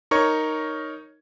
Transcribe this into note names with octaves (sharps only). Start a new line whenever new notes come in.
D#4 A#4 C#5 C#6 G#6